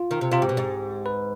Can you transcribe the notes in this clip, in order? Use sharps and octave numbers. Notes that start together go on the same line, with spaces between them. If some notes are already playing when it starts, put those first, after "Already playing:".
Already playing: F4
D#3
C3
C3 F4
G#2 G4
B2
G#2
B4